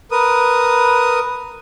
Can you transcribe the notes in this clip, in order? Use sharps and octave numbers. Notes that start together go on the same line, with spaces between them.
A#4 B4 D#6